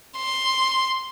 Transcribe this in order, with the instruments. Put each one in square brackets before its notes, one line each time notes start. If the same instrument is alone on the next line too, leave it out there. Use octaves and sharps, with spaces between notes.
[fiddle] C6